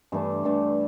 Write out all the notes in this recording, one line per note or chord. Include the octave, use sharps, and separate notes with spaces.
G2 E3 A3 D4
G2 E3 A3 D4